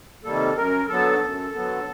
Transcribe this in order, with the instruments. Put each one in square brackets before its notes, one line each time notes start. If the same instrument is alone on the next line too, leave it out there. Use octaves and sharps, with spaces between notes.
[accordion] C3 D#3 G3 A#3 A4
F#2 A#4
D3 F#3 B3 A4
F#2
D3 F#3 B3